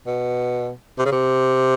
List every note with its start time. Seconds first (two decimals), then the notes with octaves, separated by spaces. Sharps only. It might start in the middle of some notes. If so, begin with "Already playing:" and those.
0.06 B2
0.98 C3
1.05 C#3
1.12 C3